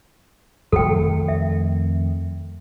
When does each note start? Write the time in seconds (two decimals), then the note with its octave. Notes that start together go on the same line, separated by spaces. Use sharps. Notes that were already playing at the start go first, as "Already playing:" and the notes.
0.72 F2 D#3 A3 A4 G5
1.28 E5